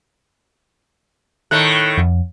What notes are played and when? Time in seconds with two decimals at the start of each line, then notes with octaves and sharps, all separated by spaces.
1.51 A2 D#3 A3 F#6
1.97 F2